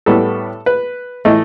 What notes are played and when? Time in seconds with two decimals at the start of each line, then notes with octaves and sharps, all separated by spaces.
0.06 A2 G3 B3 A4
0.66 B4
1.25 A2 E3 A3 D#5